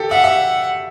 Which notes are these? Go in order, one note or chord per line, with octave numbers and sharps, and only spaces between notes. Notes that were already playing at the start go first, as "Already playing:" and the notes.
Already playing: G4 A4
E5 F#5
E5